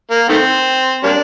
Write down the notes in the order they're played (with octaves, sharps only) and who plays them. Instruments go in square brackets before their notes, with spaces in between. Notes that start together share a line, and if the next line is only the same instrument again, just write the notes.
[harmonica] A#3
D#3 A3 C4
G3 A#3 D4